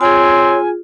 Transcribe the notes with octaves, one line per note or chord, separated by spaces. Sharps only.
C4 F4 G#4 C#5 G#5